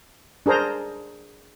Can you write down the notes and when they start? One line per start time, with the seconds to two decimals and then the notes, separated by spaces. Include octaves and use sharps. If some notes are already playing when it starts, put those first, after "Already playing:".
0.46 D4 G#4 A#4 C5 A#5